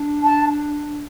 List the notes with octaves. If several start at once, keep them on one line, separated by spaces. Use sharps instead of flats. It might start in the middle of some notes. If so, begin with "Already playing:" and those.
Already playing: D4
A5